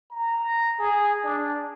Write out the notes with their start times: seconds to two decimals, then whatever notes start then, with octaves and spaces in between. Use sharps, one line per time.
0.11 A#5
0.79 G#4
1.23 D4